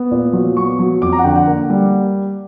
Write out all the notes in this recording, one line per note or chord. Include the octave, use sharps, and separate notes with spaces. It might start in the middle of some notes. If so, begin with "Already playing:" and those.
Already playing: B3
A#2
F#3
B3 C#6
F#3
F2 D6
A#5
F#5
D3 G5
F#5
A#3
G3